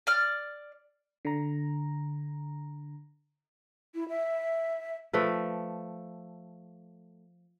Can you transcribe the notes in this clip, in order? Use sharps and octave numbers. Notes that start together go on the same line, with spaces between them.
D5 F6
D3 A#5
E4
E5
F3 A3 A4 B4